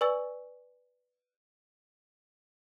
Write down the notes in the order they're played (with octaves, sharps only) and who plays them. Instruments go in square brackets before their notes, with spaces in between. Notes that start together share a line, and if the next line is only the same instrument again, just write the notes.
[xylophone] B4 D5 G#5 C#6 E6 A6